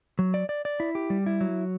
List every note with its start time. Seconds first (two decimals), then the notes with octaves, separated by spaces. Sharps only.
0.19 F#3
0.34 D5
0.49 D5
0.65 D5
0.80 E4
0.95 G4
1.10 G3
1.26 E4
1.41 F#3